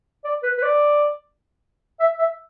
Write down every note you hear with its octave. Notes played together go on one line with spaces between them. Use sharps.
D5
B4
B4
D5
E5
E5